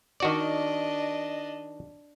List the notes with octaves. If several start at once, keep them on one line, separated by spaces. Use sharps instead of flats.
D#3 D4 F#4 D5 D#5